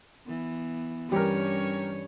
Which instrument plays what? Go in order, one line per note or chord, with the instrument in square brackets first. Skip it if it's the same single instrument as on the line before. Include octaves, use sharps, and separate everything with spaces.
[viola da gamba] E3 B3
[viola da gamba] G2 C#4 C#5 [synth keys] E3 G3 [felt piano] G4 A#4